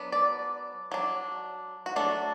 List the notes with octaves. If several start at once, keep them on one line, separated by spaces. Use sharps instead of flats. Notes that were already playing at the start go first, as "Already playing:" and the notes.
Already playing: F#3 B3 D4
D5
F#3 D4
F#4
F#3 A3 D4 A4